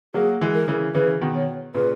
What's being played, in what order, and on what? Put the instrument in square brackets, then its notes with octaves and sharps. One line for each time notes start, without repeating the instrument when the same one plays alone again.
[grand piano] F#3 A#3 [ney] G#4
[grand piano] E3 G#3
[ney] A#4
[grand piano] C#3 E3
[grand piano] C#3 E3 [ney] B4
[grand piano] B2 D#3
[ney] C#5
[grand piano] A#2 C#3 [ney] B4